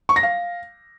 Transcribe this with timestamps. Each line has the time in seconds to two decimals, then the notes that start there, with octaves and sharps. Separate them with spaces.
0.09 C#6
0.16 A#6
0.23 F5